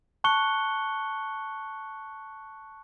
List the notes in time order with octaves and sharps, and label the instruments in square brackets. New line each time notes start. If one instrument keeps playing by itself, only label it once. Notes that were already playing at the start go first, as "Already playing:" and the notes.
[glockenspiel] A5 C#6 F#6 C#7 G7